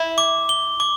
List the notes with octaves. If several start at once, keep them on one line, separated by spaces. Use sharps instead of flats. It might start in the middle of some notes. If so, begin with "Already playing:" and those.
Already playing: E4
D6
G7
D6